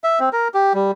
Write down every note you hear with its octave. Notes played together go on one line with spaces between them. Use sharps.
E5
C4
A#4
G4
G3